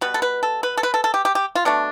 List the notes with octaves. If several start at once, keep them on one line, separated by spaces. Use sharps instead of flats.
B2 G3 B3 B4
A4
B4
A4
B4
A4
B4
A4
A4
G4
G4
G4
F4
B2 A3 D4